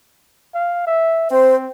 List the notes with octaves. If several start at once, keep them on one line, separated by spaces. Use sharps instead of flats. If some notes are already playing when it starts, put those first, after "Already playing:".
F5
E5
C4 C5